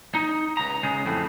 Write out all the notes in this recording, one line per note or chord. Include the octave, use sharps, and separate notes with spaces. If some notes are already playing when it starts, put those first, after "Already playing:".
D#4
C#2 A#5
C#3 G#3
F2 A2